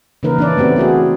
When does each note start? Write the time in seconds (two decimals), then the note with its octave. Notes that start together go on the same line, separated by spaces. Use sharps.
0.23 C#3 E3 A#3 D#4 A#4 B4
0.38 E3 C#4 D4 E4 D5
0.57 A3 B3 C4 G4
0.76 B3 E4 F#4 G#4